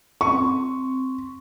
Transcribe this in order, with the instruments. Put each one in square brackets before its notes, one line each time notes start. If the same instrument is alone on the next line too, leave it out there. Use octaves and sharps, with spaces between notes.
[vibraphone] C4 [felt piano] C#6